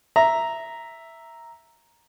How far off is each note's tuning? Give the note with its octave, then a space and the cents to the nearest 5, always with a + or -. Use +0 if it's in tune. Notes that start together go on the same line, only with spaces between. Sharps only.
E5 +0 A#5 +0